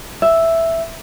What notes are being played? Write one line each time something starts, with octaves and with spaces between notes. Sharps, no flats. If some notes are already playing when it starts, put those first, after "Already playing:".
E5